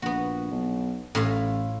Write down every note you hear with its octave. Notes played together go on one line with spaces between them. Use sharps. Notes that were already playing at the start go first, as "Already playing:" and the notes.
A#1 B3 F#4
B1
A1 A2 F4 F5